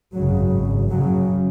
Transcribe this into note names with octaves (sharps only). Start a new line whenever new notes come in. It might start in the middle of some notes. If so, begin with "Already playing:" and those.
G#1 F#2 C#3 F#3
G#1 G#2
F#1 F#2 C#3 F#3